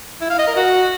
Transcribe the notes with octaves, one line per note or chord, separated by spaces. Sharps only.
E4
F5
D#5
A#4
F#4